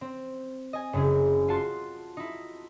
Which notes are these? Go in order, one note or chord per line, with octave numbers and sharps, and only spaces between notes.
C4
D#5 G#5
F#1 F#2 C#3 G#4
F4 F#4 A5 C6
D#4 E4